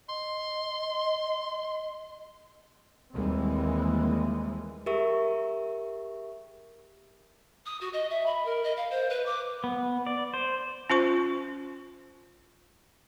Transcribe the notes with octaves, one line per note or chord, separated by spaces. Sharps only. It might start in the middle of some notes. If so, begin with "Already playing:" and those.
D#5 C6
D#2 E3 G3 G#3 A#3 C4
G4 G#4 A#4 E5 C#6
D#6
F#4
D#5
E5
B5
A#4
D#5
F5
C5
B4
D6
B3
D5
C5
C#4 F4 C5 C#6